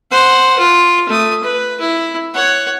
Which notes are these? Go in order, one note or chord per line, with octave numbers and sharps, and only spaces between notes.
C5 F#5
F4
A3 D#6
B4
E4
C#5 F#5